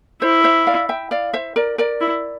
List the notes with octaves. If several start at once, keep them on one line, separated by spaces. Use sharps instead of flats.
E4 C5
C5 E5
D5 F5
E5 G5
D5 F5
C5 E5
A#4 D5
A#4 D5
E4